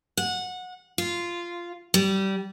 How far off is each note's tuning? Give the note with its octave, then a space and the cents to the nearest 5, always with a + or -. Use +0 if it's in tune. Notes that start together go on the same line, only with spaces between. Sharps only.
F#5 -20
F4 -10
G3 -20